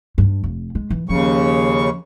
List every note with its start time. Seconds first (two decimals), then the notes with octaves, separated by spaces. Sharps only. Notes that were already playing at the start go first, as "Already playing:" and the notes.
0.18 G2
0.44 F1
0.75 G#3
0.90 E3
1.09 D#2 C#3 F3 C#4 C#6